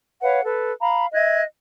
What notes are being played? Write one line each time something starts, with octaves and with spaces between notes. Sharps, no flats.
B4 C#5 F5 F#5
A4 B4
F5 A#5 B5
D#5 E5 F#6 G#6